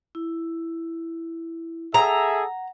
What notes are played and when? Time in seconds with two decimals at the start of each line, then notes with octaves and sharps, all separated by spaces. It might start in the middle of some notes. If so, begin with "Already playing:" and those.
0.15 E4
1.94 G#4 A4 E5 F#5 A#5